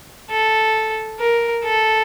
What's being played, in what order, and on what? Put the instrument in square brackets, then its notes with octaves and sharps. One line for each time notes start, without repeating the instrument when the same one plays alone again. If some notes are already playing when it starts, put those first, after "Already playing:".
[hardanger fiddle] A4
A#4
A4